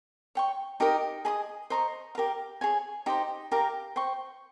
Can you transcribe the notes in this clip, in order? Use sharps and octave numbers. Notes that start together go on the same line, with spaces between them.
C#5 G5 C#6
D#4 G4 A#4 D#5
G#4 D#5 A#5 D#6
C5 D#5 A#5 C#6
G4 A#4 F5
G#4 C#5 G#5
D#4 G4 C5 D#5
G4 A#4 F5 A#5
C5 G5 C#6